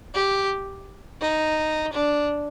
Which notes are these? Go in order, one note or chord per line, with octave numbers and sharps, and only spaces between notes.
G4
D#4
D4